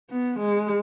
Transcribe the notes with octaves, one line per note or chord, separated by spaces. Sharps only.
B3
G#3